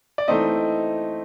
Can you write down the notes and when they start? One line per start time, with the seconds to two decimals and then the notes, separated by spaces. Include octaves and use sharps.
0.18 D5
0.28 E3 A3 C4 D#4 D#5